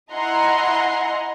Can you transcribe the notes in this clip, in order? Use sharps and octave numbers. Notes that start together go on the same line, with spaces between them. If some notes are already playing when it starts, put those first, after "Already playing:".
E4 D#5 F#5 G#5 A#5 C6